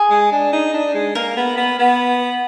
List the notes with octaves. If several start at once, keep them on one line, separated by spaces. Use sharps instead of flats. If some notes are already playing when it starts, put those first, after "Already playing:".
Already playing: G#4
G#3
D4
D#4
D4
G#3
A#3 A#4
B3
B3
B3